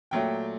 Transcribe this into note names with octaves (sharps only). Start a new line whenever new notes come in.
A#2 F#3 A3 G5